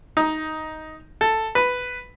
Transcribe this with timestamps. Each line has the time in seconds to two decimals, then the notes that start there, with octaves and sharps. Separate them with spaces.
0.17 D#4
1.21 A4
1.55 B4